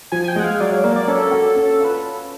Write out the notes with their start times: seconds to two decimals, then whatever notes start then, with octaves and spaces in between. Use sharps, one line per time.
0.12 F3 G#5
0.24 G#5
0.28 G5
0.36 G#3 F#5
0.44 F5
0.60 F#3 D5
0.72 C#5
0.84 A#3 D5
0.96 D5
1.08 C#4 A4
1.31 F#4
1.56 C#4
1.80 F4 B4